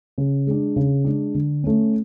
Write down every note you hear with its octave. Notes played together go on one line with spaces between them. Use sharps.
C#3
G#3 D4
C#3
G#3 D4
D3
A3 C#4